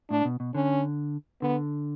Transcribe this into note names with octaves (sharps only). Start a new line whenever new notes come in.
A2 D4
B2
B2
D3 C#4
D3 B3